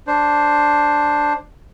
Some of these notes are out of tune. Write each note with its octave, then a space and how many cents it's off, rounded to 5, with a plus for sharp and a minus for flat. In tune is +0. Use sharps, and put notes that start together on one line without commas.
D4 +0 C5 +0